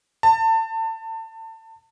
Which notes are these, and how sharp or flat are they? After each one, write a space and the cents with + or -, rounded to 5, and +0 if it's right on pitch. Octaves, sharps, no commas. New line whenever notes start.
A5 +30